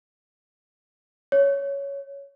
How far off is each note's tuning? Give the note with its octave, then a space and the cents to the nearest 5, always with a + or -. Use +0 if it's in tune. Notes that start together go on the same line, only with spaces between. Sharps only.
C#5 +10